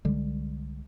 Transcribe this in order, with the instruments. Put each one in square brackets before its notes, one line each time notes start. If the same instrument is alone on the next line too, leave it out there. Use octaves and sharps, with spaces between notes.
[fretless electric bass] C2 D3 G3 G#3